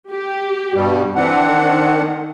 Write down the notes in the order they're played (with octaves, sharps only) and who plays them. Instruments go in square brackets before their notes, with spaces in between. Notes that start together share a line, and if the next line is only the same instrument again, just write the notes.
[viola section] G4
[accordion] G2 B2 G3
[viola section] E3 [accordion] C4 D4 F#5
[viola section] D#3